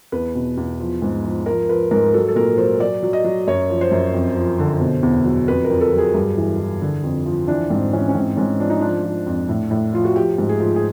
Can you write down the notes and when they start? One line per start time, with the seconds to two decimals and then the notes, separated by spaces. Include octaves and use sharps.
0.12 E2 B4
0.35 B2
0.57 E2
0.80 F3
1.02 G#2
1.24 F3
1.46 F3 A#4
1.69 F3 B4
1.91 G#2 A#4
2.14 F#3 A4
2.28 A4
2.36 A#2 A#4
2.57 F#3 C5
2.80 F#3 D5
3.03 F#3
3.13 D#5
3.24 F#3
3.47 F#2 C#5
3.70 F3
3.81 C5
3.92 F#2
4.14 F2
4.36 F3
4.59 D3
4.81 B2
5.03 E2
5.25 F#3
5.48 F2 B4
5.64 A#4
5.70 F2
5.81 A4
5.92 F#3
5.98 G#4
6.14 G2
6.37 E3
6.59 E3
6.81 D3
7.04 F2
7.26 F3
7.48 E3 D4
7.70 G#2 C4
7.93 E3 C#4
8.09 C#4
8.15 G#2 C4
8.37 G#2 C#4
8.60 F3 D4
8.70 D#4
8.81 F3 D4
9.04 F3
9.26 F2
9.49 A2
9.71 A2
9.93 F3 F4
10.05 F#4
10.15 F3 G4
10.38 G#2
10.49 G#4
10.60 F3
10.76 G#4